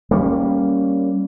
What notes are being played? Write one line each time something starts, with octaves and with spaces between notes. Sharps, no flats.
G3 A#3 C#4